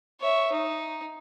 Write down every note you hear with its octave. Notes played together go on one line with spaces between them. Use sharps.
C#5 E5
D#4